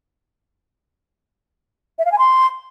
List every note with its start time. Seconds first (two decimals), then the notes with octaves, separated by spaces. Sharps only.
1.99 E5
2.05 F5
2.12 G#5
2.19 C6